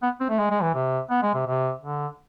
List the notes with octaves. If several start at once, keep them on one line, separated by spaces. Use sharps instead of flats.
B3
C4
A3
G#3
G#3
E3
C3
B3
G#3
C3
C3
D3